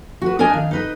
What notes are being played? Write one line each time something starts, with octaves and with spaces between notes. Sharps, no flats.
F#4 B4
D4 A#4 D5 D#5 G#5
D#3 F5
D#4 B4 D#5